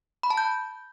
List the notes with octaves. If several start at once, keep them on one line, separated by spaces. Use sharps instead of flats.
B5
A5
G6